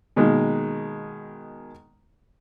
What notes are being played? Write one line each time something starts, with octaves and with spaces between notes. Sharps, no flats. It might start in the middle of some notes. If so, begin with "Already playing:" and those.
B2 D#3 G#3 A#3